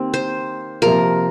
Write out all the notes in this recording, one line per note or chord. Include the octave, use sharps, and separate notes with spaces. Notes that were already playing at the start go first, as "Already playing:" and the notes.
Already playing: D#3 A#3 C4 G4
C5
C3 F3 A#3 F4 A#4